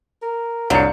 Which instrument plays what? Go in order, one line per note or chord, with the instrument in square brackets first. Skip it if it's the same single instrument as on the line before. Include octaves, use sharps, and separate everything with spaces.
[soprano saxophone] A#4
[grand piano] C2 D4 C#7 [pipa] F#3 [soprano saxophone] F5